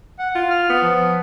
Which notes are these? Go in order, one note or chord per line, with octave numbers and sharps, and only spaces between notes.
F#5
F4
F6
B3
F3